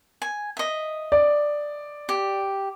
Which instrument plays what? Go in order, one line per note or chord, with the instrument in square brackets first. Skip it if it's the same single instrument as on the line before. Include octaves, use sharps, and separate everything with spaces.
[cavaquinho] G#5
D#5 E5
[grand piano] D5
[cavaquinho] G4